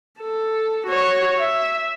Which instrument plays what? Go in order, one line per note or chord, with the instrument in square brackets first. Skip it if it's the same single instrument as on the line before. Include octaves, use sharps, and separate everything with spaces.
[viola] A4
F#4 C#5
E5